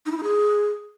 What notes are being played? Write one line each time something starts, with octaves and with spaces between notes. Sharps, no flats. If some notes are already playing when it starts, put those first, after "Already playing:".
D#4
E4
D#4
G#4